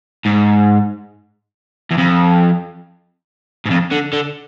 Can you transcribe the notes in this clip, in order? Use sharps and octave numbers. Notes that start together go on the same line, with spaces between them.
G#2
E2
F2
G#2
F2
D3
D3